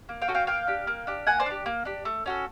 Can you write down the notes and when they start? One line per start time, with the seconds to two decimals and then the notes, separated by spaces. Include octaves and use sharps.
0.09 A#3
0.22 F5 G5
0.28 C#4 F#4 A4
0.35 F5 G5
0.47 A#3 F5 G5
0.67 D4 G4
0.87 A#3
1.07 D4 G4
1.27 A#3 F#5 G#5
1.40 C5 D5
1.46 D4 G4
1.66 A#3
1.85 D4 G4
2.05 A3
2.26 C#4 F#4 A4